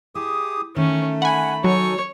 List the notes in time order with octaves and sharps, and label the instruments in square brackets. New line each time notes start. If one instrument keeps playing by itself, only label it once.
[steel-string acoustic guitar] E4 [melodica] G4 G#4 D#6
[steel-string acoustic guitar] D#3 [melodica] A3 [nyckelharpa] C#4
[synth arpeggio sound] F#5 G#5 [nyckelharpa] B5
[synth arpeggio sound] F#3 [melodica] D#4 A4 G#5 [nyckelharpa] C#5